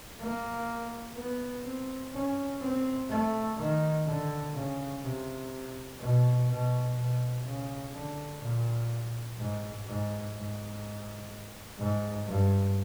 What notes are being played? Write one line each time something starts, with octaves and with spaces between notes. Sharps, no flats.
A#3
B3
C4
C#4
C4
A3
D#3
D3
C#3
C3
B2
B2
B2
C#3
D3
A#2
G#2
G#2
G#2
G#2
G2